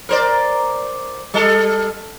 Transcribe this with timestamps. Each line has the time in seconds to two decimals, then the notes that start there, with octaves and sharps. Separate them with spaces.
0.09 A#4 C5 D5
1.34 G3 A4